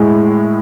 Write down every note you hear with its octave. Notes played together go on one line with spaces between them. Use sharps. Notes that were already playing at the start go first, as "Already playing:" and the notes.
Already playing: A2 G#3